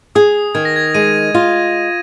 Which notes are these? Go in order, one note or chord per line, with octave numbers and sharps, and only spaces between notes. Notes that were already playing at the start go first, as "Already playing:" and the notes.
G#4 D#6
D#3 G#6
A#6
G#6
G#3 D#7
F4